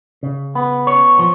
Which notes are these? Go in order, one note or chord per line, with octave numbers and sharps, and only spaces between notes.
C#3
B3
C#5
F3